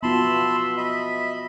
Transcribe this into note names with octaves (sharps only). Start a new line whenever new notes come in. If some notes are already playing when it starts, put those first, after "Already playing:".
B3 F4 F#4 E5 A5 B5 C6
D#5 E5 B5